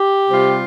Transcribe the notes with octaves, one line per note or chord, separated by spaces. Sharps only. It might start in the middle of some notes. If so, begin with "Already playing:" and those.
Already playing: G4
C3 G3 C4 F4